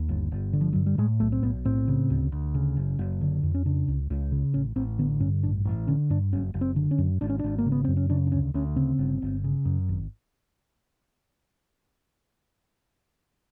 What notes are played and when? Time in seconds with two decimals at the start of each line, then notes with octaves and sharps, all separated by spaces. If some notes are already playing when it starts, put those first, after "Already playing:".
Already playing: D#2
0.09 G1
0.32 G1
0.53 D3
0.61 F3
0.73 G2 F#3
0.86 G3
0.98 A2 G#3
1.20 B1 A3
1.32 C4
1.43 B1 B3
1.65 A2 C4
1.88 C#3
2.10 D2
2.32 D2
2.55 C#3
2.77 F#1
2.99 F#1
3.21 D3
3.43 F2
3.54 C#4
3.66 C#3 D4
3.88 C#2
4.10 C#2
4.32 C#3
4.54 A1 C#4
4.76 A1 C4
4.99 D3 B3
5.20 G2 C#4
5.43 A1 D4
5.65 A1
5.87 D3 C#4
6.10 G2 D4
6.33 F#1 C#4
6.54 F#1
6.61 C4
6.76 D3
6.91 C#4
6.98 F#2
7.21 G#1 D4
7.29 C#4
7.39 G#1 D4
7.58 A#3
7.66 C#3
7.72 B3
7.84 F#2 C4
7.97 C#4
8.10 C#3 D4
8.27 D4
8.32 D2 C#4
8.54 D2 C#4
8.76 C#3 C4
8.99 G1
9.22 G1
9.44 C#3
9.65 F#2
9.89 G#1